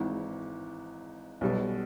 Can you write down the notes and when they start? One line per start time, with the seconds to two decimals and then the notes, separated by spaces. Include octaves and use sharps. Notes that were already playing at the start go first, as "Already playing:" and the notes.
Already playing: G#1 G#2 E3
1.41 B1 B2 G3